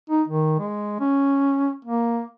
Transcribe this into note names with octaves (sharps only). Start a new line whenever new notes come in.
D#4
D#3
G#3
C#4
A#3